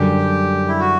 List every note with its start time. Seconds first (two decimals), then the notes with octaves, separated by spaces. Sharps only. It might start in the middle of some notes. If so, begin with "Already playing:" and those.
Already playing: F#2 D3 G3 G4
0.68 E4
0.80 F#4